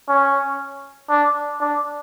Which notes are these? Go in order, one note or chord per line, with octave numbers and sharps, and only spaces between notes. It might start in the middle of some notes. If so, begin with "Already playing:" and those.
C#4
D4
D4